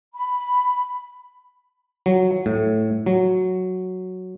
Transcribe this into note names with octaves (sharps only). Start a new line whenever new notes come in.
B5
F#3
A2
F#3